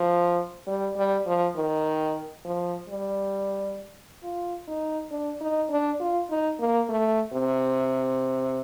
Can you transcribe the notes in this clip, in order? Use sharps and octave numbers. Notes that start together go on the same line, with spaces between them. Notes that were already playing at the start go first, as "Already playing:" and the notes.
Already playing: F3
G3
G3
F3
D#3
F3
G3
F4
D#4
D4
D#4
D4
F4
D#4
A#3
A3
C3